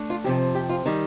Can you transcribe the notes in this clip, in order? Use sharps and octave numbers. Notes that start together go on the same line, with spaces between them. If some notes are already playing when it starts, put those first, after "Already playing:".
Already playing: A3 D4
F4
F2 C3 F3 G4
G4
F4
D#3 G3